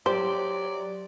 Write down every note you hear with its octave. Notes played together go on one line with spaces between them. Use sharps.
F#3 G4 C5 D5